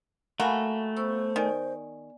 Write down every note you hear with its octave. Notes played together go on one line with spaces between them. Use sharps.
A3 A#3 F#4 F5 G#5 B5
B3 C5 C#6 E6
D#3 D5 G#5